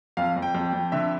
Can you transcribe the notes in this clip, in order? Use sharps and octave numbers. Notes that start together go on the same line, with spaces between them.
F2 F5
F2
G5
F2
F2
D3 E5